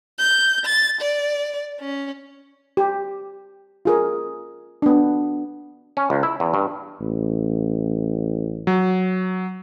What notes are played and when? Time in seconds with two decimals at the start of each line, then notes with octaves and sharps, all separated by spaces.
0.19 G6
0.66 A6
1.01 D5
1.80 C#4
2.77 G4
3.85 F4 G#4 A#4
4.82 B3 D4
5.97 C#4
6.10 C#2
6.23 E4
6.40 E2
6.54 G2
7.00 A1
8.67 F#3